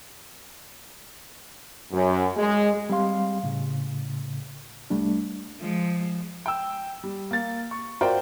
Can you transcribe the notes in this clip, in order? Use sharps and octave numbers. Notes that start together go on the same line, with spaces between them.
F#2
G#3
G3 C4 G4 F5 C6
A2 C#3
C2 G3 A3 D4
F3 G#3
G5 E6
G3
A#3 A6
C#6
F4 F#4 A#4 C5 D5 G5